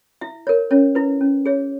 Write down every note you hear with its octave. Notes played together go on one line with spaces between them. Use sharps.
E4 E5
A#4 C#5
C#4 C#5
E4 B4
C#4
G#4 C#5